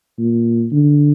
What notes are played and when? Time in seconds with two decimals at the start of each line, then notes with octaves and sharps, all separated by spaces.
0.19 A#2
0.72 D3